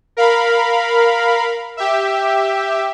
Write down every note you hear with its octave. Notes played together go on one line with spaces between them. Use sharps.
A#4 F5 B5
G4 E5